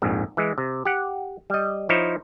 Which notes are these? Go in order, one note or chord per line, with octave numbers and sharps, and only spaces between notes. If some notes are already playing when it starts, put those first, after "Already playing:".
A#1 F2 G#2
E3 G#3
C3
G4 F#5
G3 D#5
F3 D#4 E4 C5 C#5